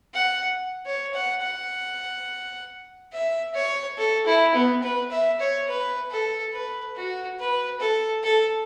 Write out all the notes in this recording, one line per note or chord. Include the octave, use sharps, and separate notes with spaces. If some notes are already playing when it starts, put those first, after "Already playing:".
F#5
C#5
F#5
F#5
E5
C#5
A4
E4
B3
B4
E5
C#5
B4
A4
B4
F#4
B4
A4
A4